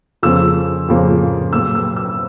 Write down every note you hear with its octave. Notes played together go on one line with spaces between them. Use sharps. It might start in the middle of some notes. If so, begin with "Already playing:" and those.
F2 C#3 F3 A#3 C#4 E6
F2 C#3 F3 A#3 C#4
A#2 F#3 A#3 E6
E6
E6